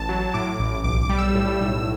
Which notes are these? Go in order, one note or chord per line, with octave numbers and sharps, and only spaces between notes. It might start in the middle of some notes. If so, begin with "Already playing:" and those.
Already playing: A1 A5
F#3
A2 D6
A1
B1 D6
D6
G3
E6
A2
B1